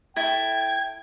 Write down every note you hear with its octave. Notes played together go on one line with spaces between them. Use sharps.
E4 A4 G5 C#6 G#6